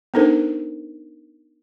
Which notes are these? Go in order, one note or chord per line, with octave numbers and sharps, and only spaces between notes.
B3 D4 D#4 A4 A#4 C5